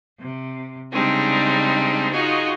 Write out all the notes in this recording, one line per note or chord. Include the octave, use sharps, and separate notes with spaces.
C3
C#3 G3 G#3 C4 D4 D#4
D#4 F4 F#4 G#4 D#5